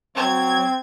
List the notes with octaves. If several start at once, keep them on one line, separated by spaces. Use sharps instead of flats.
F#3 C4 G#6